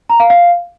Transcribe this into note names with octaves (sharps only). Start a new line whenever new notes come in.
A#5
F5
F5